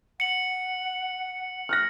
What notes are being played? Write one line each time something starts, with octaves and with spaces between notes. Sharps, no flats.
F#5 C#7 F#7
F6 F#6 A#6